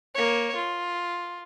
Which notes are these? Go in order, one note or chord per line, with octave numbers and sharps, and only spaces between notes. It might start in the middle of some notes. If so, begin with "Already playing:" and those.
A#3 C#5
F4